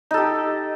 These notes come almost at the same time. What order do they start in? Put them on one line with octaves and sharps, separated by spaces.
D#4 A4 G4